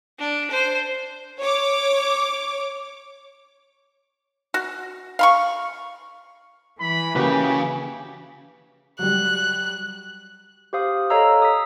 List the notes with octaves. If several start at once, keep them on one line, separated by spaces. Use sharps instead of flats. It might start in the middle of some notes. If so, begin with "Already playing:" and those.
D4
C5
C#5 D6
F#4
F5 B5 C#6
E3 B5
C#3 A#3 F#4 G4 B4
F#3 G3 F#6
G4 C5 F5 D#6
A4 C#5 D#5 F5 A#5 E6
D#6 B6